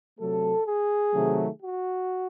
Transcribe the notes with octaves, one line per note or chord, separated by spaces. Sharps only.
C3 F#3 A3 A4
G#4
C3 D#3 F#3 A3
F#4